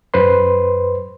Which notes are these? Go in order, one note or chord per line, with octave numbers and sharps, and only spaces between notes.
F#2 B4 C5 C6